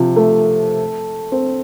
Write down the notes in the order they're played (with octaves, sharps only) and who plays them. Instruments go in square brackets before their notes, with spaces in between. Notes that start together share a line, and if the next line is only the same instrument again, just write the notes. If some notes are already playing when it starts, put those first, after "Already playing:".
Already playing: [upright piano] C3 F3
A3
C4